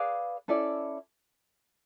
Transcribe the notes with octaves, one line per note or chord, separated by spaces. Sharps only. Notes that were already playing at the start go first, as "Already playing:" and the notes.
Already playing: G#4 B4 D5 F5
C#4 E4 A4 D5